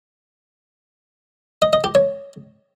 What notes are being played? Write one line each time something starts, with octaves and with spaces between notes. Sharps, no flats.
D#5
D#5
G4
C#5